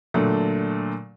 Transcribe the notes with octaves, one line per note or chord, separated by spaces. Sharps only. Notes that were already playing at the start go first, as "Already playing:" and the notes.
A#2 D3 F#3 A3